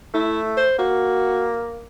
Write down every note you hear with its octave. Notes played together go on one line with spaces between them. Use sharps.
A3 E4
C5
A#3 F#4